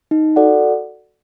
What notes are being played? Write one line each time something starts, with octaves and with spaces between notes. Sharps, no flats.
D#4
F#4 A4 D5 F#5